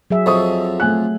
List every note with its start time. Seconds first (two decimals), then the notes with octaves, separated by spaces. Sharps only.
0.10 F#3 G#4 E5
0.26 F2 F3 D#5 C#6 D#6
0.80 A3 G#5 F#6